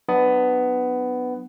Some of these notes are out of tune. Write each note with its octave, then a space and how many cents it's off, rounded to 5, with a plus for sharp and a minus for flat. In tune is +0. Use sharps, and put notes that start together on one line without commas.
F#3 +10 B3 +15 D4 +35